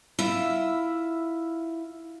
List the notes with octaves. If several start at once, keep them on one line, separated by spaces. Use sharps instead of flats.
E4 F4 E5